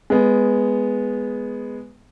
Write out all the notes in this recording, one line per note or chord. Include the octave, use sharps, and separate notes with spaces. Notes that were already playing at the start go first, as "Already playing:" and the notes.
G#3 B3